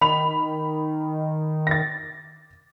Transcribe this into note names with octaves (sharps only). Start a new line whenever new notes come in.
D#3 B5 F7
A6 A#6